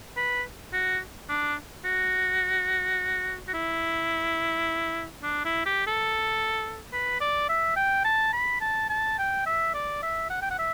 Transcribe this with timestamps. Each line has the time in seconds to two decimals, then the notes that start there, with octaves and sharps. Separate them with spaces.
0.16 B4
0.73 F#4
1.29 D4
1.85 F#4
3.48 F#4
3.54 E4
5.23 D4
5.44 E4
5.66 G4
5.87 A4
6.93 B4
7.21 D5
7.49 E5
7.76 G5
8.05 A5
8.33 B5
8.61 A5
8.89 A5
9.18 G5
9.46 E5
9.74 D5
10.02 E5
10.30 F#5
10.42 G5
10.51 F#5
10.58 E5